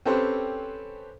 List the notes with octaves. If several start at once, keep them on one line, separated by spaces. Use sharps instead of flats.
C4 C#4 G4 A4 B4 C5